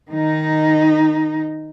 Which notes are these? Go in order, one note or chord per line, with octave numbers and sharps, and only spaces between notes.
D#3 D#4